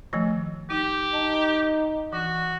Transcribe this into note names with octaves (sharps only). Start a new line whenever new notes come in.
D#3 F3 A3
D#4 G4
D#4 A5
E3 F#4